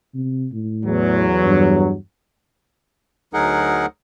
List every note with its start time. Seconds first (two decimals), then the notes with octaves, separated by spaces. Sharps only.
0.14 C3
0.53 A2
0.86 E2 F#3
1.44 G2
3.34 D2 F#3 D#4 G#4 A#4 F#5